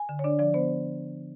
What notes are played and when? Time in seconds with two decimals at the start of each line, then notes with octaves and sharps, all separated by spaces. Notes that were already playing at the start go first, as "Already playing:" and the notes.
Already playing: G#5
0.09 D3
0.19 C#5
0.24 D4 D5
0.39 F3 D5
0.54 B3 C5